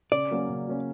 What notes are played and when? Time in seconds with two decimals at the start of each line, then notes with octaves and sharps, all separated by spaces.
0.12 C#3 D5
0.31 F#3 A#3 C#4
0.49 C#3
0.68 F#3 A#3 C#4